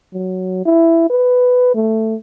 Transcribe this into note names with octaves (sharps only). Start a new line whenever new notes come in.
F#3
E4
B4
A3